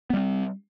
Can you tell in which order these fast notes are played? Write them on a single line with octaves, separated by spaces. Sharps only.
B3 G3 C4